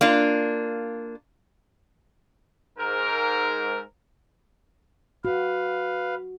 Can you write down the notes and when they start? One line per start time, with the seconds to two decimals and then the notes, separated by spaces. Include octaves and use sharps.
0.01 A#3 D4 F4
2.79 G#2 A#4
5.25 F#4 B4 F5